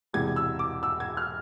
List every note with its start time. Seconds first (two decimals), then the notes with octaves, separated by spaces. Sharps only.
0.13 E1 E2 C3 G#6
0.36 E6
0.59 D6
0.83 E6
1.00 G#6
1.17 F6